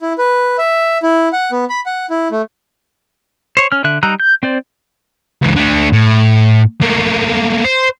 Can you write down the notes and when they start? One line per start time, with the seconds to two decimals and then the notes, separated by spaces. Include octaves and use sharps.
0.01 E4
0.18 B4
0.58 E5
1.03 E4
1.33 F#5
1.52 B3
1.70 B5
1.86 F#5
2.10 E4
2.32 A3
3.57 C5 C#5
3.72 C#4 F6
3.84 D3 E5 F#6
4.03 G3 D#4 A#5 E6 F#6
4.20 G6
4.43 C4 C5 D5
5.42 C#2 E3
5.56 D3 A3
5.93 A2
6.81 A3 A#3
7.64 C5